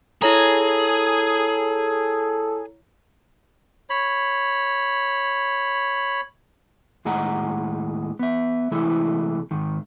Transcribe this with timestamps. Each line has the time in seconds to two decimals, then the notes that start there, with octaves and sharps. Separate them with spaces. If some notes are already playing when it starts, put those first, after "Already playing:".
0.22 E4 G#4 A4 C#5 A#5
3.90 C#5 B5
7.05 D#2 A2 G#3 D#4 F#5 A#5
8.19 B3 E5
8.71 C3 E3 G#3 A3 E4
9.51 G#2 D#3